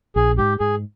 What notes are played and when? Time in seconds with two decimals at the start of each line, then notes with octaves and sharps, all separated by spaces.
0.16 A#1 G#4
0.38 G#2 G4
0.59 G#2 G#4